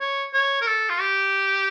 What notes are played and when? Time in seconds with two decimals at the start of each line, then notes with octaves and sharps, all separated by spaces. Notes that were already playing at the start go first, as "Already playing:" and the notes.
0.01 C#5
0.34 C#5
0.62 A#4
0.67 A4
0.89 F4
1.00 G4